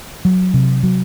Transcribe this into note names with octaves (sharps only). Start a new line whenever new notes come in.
F#3
C3
F#3